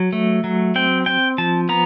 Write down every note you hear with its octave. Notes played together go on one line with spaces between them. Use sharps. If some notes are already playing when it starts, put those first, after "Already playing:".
Already playing: F#3
A3
F#3
C4 G5
C4 G5
F3 A5
B3 A#5